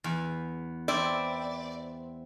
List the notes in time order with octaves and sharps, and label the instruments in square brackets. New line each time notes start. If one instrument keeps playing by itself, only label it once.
[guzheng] E2
[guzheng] C4 E4 [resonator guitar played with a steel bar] D5